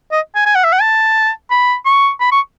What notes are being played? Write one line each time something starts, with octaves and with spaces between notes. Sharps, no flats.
D#5
G#5
G#5
F#5
E5
F#5
A5
B5
C#6
B5
C#6